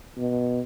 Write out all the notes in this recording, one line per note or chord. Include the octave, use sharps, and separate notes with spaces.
B2